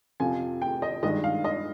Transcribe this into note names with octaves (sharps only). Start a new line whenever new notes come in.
F2 C3 F3 G#5
G5
D#5
G2 D#3 G#3 D#5
F5
D#5